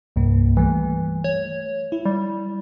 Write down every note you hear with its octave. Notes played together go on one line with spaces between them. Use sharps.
C2 G2 A#3
E3 G3 A3
C#5
E4
G3